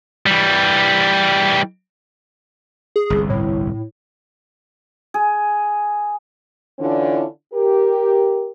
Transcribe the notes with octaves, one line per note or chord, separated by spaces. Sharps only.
E3 G3
G#4
G1 C2
A2
G#4
D3 E3 C#4 D4 E4 F4
G4 A#4